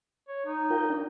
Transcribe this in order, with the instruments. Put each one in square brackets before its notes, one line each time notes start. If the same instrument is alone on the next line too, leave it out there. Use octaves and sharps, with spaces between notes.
[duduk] C#5
D#4
[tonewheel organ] F4 A#4 G5
D4